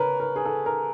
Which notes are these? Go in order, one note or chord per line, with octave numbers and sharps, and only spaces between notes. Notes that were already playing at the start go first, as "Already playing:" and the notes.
Already playing: C#3 A#4 B4 C#5
A#4
G#4
A4
A#4